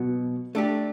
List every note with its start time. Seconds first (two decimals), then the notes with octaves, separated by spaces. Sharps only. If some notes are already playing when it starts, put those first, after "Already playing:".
Already playing: B2 F#3 B3
0.55 A3 D4 G4